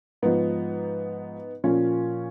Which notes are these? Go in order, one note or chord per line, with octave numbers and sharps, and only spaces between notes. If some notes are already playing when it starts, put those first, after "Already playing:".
G#2 F3 B3 D#4
A#2 F3 C#4 F4